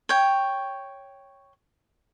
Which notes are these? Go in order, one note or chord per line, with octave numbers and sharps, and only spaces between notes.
C#5 G5